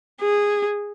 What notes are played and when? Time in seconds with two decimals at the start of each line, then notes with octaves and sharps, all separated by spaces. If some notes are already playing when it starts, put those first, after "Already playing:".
0.21 G#4